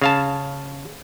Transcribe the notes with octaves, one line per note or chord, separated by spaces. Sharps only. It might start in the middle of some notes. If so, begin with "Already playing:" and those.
C#3 F5 A5